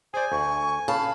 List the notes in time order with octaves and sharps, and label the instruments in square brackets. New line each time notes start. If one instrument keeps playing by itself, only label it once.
[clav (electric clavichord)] G#4 D5 [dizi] C5 [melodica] G#5
[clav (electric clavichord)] D2 [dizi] C#6
[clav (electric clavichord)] C#3 [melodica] F5 [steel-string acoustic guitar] A5 [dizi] B5